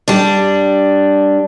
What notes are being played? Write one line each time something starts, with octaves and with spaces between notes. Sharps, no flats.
G3 D4